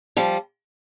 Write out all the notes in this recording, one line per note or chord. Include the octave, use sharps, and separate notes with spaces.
F3 G3